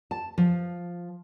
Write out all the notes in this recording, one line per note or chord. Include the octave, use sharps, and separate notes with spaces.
A5
F3